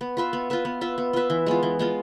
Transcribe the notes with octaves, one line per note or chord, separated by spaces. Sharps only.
B3
F4 B4 E5
B3
F4 B4 E5
B3
F4 B4 E5
B3
F4 B4 E5
E3
G#3 B3 F4
E3
G#3 B3 F4